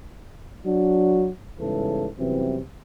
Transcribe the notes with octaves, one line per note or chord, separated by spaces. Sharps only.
F#3 D4 F#4
E2 G#2 C#3 E3 G3 A4
C2 F#2 C3 E3 B3 C4